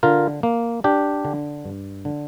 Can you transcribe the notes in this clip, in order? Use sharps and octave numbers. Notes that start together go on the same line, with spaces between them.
D3 F4 A#4
A#3
D4 G4
D3
G2
D3